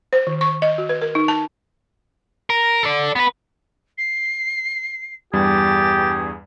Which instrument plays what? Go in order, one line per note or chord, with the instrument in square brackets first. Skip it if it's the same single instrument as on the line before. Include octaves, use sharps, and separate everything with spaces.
[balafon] C5
D#3
C#6
D#5
F#4
B4
A#4
D#4
A5
[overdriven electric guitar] A#4
A4 D5
B3 B4
[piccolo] C7
[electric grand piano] E2 G2 G3 [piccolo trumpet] G4 [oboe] G#4 [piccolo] A6